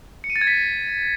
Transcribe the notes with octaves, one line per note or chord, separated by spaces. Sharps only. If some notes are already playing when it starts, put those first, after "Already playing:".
C#7
D#7
A6
G#6
B6